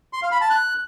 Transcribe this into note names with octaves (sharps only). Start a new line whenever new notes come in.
C6
F5
B5
A5
F#6